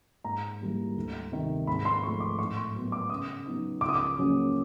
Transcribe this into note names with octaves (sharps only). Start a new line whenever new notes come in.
G#2 A#5
E3 G3 A#3
D2
C3 D#3
G#2 B5
C6
F3 A3 C#6
D6
A2 C#6
C6
F#3 B3
D6
C#3 D#6
F#3 B3 D#4
C#2 D6
D#6
D6
C#3 F#3 A#3 C#4